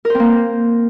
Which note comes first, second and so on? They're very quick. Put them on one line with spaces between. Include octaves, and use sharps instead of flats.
A#4 C5 C4 A#3